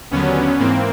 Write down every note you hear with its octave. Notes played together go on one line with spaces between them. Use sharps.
D#2 D3 F#3 B3 C#4
G#2 E3 A#3 C4